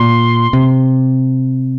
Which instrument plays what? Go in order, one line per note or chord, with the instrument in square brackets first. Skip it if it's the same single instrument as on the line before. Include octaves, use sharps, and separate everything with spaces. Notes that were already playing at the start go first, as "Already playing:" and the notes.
Already playing: [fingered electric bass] A#2 [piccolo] C6
[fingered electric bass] C3